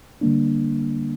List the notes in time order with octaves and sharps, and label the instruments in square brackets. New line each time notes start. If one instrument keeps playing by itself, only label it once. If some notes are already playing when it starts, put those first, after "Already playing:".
[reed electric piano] D3 G3 A#3 D4